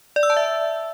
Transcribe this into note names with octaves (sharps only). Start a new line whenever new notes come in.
D5
E6
A5
E5